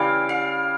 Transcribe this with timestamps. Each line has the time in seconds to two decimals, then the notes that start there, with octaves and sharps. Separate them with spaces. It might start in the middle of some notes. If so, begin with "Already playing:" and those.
Already playing: C#3 E3 G3 F5 G5
0.29 F5